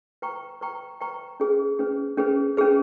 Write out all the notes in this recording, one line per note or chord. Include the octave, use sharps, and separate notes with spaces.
B4 G5 A#5 C#6
B4 G5 A#5 C#6
B4 G5 A#5 C#6
C#4 G#4 B4
C#4 G#4 B4
C#4 G#4 B4
C#4 G#4 B4